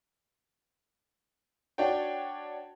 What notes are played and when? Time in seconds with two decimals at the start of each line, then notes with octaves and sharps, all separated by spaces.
1.78 D4 F#4 C#5 G5